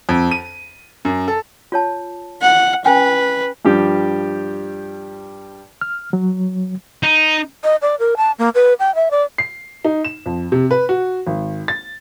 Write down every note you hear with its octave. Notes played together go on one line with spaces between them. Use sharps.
F2
D#7
F#2
A4
F4 C#5 A5
F#5
C#4 B4 G5 G#5
G2 F3 G3 G4
F6
F#3
D#4
D#5
D5
A#4
A5
A#3
B4
G5
E5
D5
C7
D#4
E7
F2
C3
B4
F#4
G#1
A6